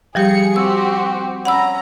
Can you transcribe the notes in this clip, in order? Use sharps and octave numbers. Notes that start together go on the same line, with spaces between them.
F3 G3 G4 G#4 C#7
C4 F#4 G4 E6
C#4 F#5 A#5 B5 E6